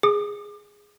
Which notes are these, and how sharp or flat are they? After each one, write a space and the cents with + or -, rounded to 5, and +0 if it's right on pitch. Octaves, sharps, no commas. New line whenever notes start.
G#4 -5 D6 +30